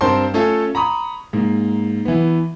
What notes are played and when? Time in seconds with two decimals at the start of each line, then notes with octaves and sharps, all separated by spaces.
0.01 G2 C4 A#4 C5 A5 C6
0.34 A3 C#4 F4 A4 C#5
0.75 A#5 B5 C#6 D#6
1.33 G#2 A#3
2.05 E3 B3